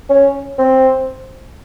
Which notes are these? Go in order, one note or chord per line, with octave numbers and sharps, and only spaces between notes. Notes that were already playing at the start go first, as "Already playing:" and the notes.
C#4
C4